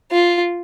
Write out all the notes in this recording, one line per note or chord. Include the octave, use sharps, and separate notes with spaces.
F4